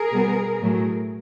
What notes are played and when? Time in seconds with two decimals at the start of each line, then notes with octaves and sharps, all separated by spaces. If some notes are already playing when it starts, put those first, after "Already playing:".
Already playing: G#4 A#4
0.13 B2 G3 B3
0.61 A2 F#3 A3